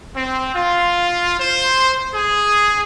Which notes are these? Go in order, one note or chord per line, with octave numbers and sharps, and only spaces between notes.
C4
F4
C5
G#4